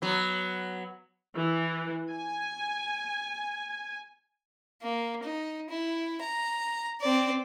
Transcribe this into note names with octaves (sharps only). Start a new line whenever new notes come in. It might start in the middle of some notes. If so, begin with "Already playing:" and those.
F#3 B3
E3
G#5
A#3
D#4
E4
A#5
C4 D5